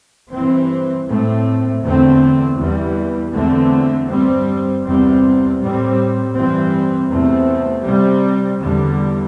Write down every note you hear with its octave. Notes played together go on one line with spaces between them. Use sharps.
G2 E3 C4
A2 A3 C4
E2 D3 A3 C4
E2 E3 G3
E2 D3 A3 C4
G2 G3 C4
E2 C3 G3 C4
A2 G3 C4
G2 E3 G3 C4
E2 C3 A3 C4
C3 G3 C4
E2 D3 G3